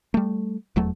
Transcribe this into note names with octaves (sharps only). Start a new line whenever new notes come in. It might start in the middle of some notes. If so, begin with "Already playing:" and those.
G3 A3
F1 E2 F#3 A3